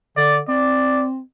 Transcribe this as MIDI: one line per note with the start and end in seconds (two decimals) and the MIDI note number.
0.17 0.42 50
0.17 0.37 74
0.49 1.20 60
0.49 1.05 74